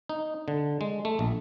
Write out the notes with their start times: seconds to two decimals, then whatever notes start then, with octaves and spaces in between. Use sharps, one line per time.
0.09 D#4
0.48 D3
0.81 G#3
1.05 A3
1.19 A#1